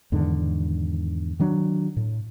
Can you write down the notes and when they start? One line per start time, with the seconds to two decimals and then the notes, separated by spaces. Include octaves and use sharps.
0.12 E2 G#2 D3 D#3
1.39 D#3 F#3 D4
1.97 A2